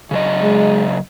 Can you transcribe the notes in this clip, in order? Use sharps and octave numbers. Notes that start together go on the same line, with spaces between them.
C#3 F#3 D#5
G#3